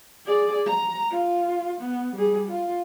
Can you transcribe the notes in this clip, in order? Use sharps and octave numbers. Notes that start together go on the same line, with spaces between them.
G#4 D5
A#5
F4
B3
G3 G#4
F4